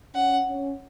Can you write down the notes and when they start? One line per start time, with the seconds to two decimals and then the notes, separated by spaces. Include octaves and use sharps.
0.15 C#4 F#5
0.47 C#4